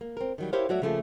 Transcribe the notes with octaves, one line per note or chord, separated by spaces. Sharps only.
A#3
C4 A#4
D#3 F#3 G3
E4 G4 A#4 C5 C#5 F5
F#3 A3 F#4 C#5 D5 E5
C#3 F3 A3 A#3 F4 G#4